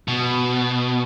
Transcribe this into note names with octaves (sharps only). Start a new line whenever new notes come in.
B2